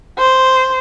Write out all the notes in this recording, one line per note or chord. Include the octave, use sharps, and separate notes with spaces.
C5